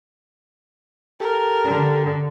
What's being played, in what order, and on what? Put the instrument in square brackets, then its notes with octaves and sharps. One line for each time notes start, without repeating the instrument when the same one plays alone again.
[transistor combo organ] G4 A4 [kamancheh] A#4
[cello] D3